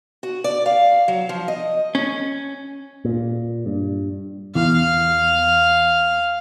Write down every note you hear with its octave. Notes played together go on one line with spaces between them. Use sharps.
F#4
D5
F5
F#3
F3
D#5
C#4
A#2
G2
E2 F5